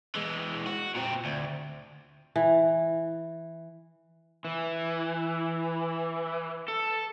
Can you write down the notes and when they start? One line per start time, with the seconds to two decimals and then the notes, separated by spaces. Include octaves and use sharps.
0.15 E3 G#3
0.66 F#4
0.94 A#2 C4
1.25 D2
2.36 E3
4.45 E3
6.68 A4